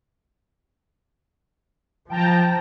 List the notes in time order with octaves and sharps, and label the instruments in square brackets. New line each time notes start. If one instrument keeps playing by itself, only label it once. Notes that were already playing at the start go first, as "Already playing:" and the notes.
[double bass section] F3 [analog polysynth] G5 A5 A#5